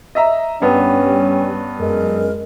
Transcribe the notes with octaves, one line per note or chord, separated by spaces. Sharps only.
D#5 E5 A#5
G2 G3 B3 C#4 G5
F#2 G#3 A#4